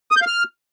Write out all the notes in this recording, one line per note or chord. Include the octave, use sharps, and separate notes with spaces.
D#6
G6
F5
F6